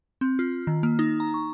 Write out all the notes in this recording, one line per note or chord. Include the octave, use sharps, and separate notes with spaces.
C4
F4
D#3
A#3
D#4
A#5
C#6